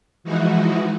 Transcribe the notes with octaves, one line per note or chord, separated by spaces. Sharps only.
E3 F3 G#3 D#4 E4 F#4